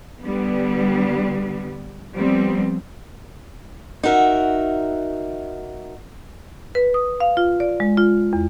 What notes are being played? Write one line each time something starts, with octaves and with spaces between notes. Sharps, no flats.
D3 G3 B3
F3 G3 B3 C4
D#4 F#4 A#4 E5
B4
D#6
F5
F4
D5
G#3
F4
E2